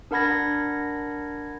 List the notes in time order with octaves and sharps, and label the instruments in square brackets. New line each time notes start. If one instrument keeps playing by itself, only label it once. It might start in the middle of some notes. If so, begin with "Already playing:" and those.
[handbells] D4 A#4 F#5 B5 G#6 A#6